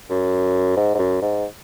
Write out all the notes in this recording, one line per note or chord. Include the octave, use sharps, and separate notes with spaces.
F#2
G#2
G#2
F#2
G#2